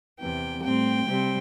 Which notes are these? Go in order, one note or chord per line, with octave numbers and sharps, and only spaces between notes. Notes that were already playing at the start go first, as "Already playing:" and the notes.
E2 C3 E3 G5
A2 G3 C4 G5
C3 G3 C4